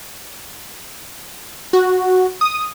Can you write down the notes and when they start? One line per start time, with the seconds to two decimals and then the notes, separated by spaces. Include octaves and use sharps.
1.73 F#4
2.41 D#6